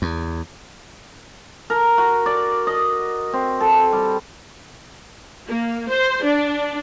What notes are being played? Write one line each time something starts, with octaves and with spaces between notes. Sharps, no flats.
E2
A#4
F#4
D5
D#5
C4
A4
G3
A#3
C5
D4